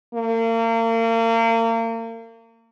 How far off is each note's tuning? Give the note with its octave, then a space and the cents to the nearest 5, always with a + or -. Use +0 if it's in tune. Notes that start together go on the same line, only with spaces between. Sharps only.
A#3 -35